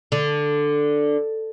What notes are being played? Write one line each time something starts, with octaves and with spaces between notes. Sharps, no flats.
D3